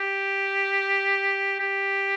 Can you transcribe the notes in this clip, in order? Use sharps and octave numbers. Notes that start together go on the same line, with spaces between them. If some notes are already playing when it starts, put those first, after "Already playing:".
Already playing: G4
G4